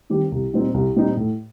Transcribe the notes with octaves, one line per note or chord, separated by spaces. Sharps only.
D#3 G3 C4 G4
C2
A#2 G3 C4 D#4
C2
A#2 G3 C4 D#4
A2